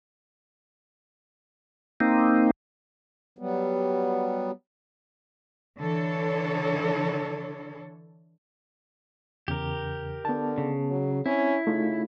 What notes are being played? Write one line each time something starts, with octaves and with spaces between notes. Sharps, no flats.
A#3 C4 D#4
F#3 G3 B3
D3 E3 D4 A4 C#5
E2 C#3 G4 A#4
D3 B3 A5
C#3
F#3
C4 C#4 E4
C#3 A3 D#4 F4